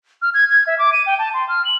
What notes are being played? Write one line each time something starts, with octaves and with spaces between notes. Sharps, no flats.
F6
G#6
G#6
E5
D6
D#7
G5
A5
C6
F6
F#7